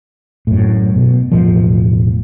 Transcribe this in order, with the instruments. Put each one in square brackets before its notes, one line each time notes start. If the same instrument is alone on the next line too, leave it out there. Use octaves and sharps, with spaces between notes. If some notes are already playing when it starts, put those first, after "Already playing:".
[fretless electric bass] F#2 A2
B2
E1 A2 F3